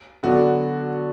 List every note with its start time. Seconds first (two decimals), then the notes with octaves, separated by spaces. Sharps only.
0.23 D3 F#3 B3 D4 F#4